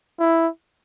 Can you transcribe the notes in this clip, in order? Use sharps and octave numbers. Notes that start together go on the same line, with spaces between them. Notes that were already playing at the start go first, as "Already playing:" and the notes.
E4